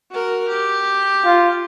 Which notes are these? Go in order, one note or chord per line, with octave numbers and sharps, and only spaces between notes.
F#4 A#4
G4
F4